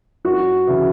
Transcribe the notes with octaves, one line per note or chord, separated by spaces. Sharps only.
F#2 F#4
C#3 E3